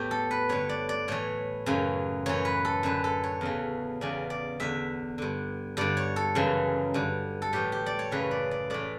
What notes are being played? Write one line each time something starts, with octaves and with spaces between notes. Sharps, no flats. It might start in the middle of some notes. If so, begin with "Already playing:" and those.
Already playing: E2 A2 E3 G4
A4
B4
G2 D3 C#5
D5
D5
A2 E3 C#5
F#2 C#3 E3
F#2 E3 C#5
B4
A4
F#2 D3 B4
A4
C#5
E2 C#3 E3
E2 C#3 E3 D5
D5
E2 D3 E5
G2 D3
G2 D3 D5
C#5
A4
F#2 C#3 E3
G2 D3
A4
A2 E3 G4
G4
D5
C#5
F#2 C#3 E3 B4
D5
D5
A2 E3 D5